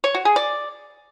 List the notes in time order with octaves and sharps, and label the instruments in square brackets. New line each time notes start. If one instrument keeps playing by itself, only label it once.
[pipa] C#5
F#4
G#4
D5